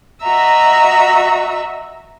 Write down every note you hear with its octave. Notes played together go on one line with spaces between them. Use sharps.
F#4 D#5 E5 A#5 E6